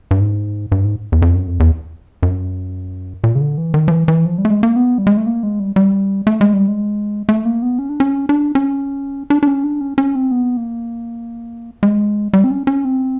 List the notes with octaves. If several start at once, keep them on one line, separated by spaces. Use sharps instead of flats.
G2
G#2
G2
G#2
E2
F2
F#2
F2
E2
F#2
A#2
C#3
D3
E3
D#3
F3
E3
E3
F3
G3
A3
G#3
A#3
B3
G3
G#3
A3
A#3
G#3
G3
G3
A3
G#3
G3
G#3
A3
A#3
B3
C#4
D4
C#4
D4
C#4
D4
D4
C#4
D4
C#4
C#4
C4
B3
A#3
G#3
G3
C4
C#4
C#4
C4